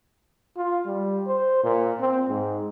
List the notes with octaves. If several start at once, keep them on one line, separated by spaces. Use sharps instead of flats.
F4
G3
C5
A#2
C4
G#2